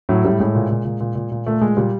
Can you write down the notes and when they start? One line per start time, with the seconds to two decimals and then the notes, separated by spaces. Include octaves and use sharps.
0.09 A2 F#3
0.24 A2 G3
0.39 A2 G#3
0.55 A#2
0.70 A#2
0.85 A#2
1.00 A#2
1.15 A#2
1.31 A#2
1.46 A#2 A3
1.61 A#2 G#3
1.77 A#2 G3